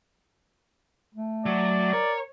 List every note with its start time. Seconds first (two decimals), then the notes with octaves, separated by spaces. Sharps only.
1.15 A3
1.46 F#3 D5
1.93 A#4 C#5